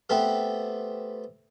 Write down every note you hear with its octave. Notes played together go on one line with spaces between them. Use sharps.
A3 B3 C4 G4 A4